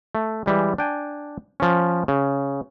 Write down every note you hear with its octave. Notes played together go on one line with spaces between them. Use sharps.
A3
E3 G3 G#3
D4 G5 G#5
F3 C#4
C#3